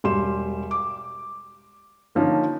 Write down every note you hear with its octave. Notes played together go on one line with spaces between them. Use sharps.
E1 G3 C6 E7
D6
D3 D#3 F3 A#3 C#4 D#4